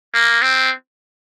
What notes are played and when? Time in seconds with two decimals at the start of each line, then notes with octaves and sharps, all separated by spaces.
0.14 A#3
0.42 C4